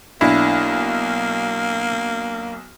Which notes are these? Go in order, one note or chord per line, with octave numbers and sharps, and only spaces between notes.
B1 A#3 D4 E4